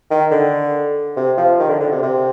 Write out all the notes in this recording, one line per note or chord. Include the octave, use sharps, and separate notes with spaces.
D#3
D3
C3
F3
D#3
D3
D3
C3
C3